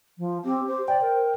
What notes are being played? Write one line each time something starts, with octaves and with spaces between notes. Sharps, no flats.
F3
C4 G4
C5
D5 G5
A#4